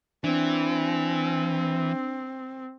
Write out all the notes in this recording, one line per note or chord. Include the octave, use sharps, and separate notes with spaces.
E3 C4 D4